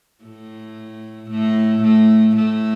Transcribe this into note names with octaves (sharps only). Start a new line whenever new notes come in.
A2 A3
A2 A3
A2 A3
A2 A3